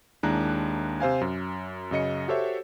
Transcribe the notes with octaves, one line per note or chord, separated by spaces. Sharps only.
D#2 G#3 D4 E4 A#5 F#6
C3 C5 F5 G#5
F#2
F#2 C#3 D#5 C#7
F#4 G4 A4 C5 C#5 E5